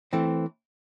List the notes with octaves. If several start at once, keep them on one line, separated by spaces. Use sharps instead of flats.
E3 A3 C4